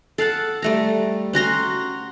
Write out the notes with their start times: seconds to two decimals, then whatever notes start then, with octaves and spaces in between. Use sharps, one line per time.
0.18 A4 F5 F#5 A5
0.62 G3 A3 A#5
1.33 C#4 F#4 A#5 C6